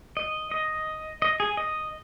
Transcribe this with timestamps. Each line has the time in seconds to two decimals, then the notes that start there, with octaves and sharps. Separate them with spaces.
0.17 D#5
0.51 D#5
1.22 D#5
1.40 G#4
1.57 D#5